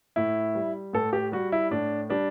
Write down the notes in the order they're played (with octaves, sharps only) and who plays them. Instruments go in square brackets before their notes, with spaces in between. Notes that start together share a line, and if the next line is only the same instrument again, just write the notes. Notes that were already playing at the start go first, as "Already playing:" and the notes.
[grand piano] A2 E4
G3
A2 A4
G4
G3 F#4
E4
A2 D4
G3 D4